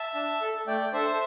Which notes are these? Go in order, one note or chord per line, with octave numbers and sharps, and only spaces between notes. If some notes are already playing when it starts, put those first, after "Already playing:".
Already playing: E5 A5
D4
A4
A3 D5 G5
D4 A4 C5 E5